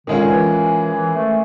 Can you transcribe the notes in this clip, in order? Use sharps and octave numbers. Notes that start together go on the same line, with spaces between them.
D3 D#3 G#3 C#4 F4 G#4
E3
E3
A3